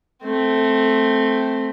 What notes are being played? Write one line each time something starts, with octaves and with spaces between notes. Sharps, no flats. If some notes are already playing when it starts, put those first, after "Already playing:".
A3 C4